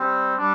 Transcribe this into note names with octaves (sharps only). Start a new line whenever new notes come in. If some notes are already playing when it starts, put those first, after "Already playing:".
Already playing: G3 C4
G3 D4